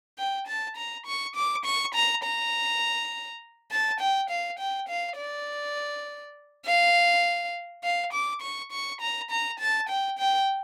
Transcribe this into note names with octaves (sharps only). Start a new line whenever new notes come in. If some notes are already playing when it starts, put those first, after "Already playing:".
G5
A5
A#5
C#6
D6
C#6
A#5
A#5
A5
G5
F5
G5
F5
D5
F5
F5
D6
C#6
C#6
A#5
A#5
A5
G5
G5